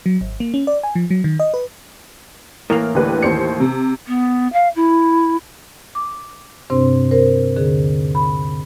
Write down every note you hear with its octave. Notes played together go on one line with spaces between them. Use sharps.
F#3
G#1
A#3
C#4
D5
G#5
F3
F#3
D#3
D#5
B4
A2 E3 A#3 A#4
D2 G4 B4
D#2 C5 C#7
C3
B3
F5
E4
D6
G2 C3 C4 D4 C5 C6
A#4 C5
D#2 D3 G#4
B5